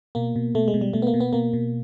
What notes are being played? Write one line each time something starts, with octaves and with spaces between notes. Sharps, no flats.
B2 A#3
B2
B2 A3
G#3
B2
G3
B2 A3
B3
A#3
B2
B3
B2 A#3
B2